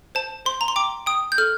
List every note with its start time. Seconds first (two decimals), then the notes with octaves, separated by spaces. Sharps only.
0.15 C5 A5
0.46 C5 C6
0.61 A#5
0.68 C6
0.76 G5 D6
1.06 G5 D#6
1.32 G6
1.38 A4 F6